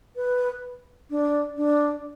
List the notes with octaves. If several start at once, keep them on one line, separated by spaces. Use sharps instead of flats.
B4
D4
D4